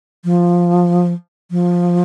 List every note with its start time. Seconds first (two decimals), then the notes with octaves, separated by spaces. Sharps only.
0.24 F3
1.51 F3